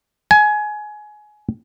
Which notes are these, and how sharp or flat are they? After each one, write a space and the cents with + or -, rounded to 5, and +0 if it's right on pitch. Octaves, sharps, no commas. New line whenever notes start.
G#5 +20